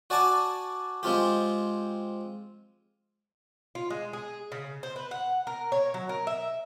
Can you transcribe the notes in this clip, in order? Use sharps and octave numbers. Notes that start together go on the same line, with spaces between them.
F#4 D5 G#5 A5 D6
G#3 C4 F4 G4
F4
G#3
G#4
C#3
C5
B4
F#5
A#4
C#5
F#3
A#4
E5